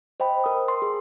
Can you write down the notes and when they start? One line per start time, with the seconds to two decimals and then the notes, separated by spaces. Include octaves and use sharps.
0.20 C5 D#5 G5 B5
0.44 A#4 D#6
0.68 C6
0.82 G#4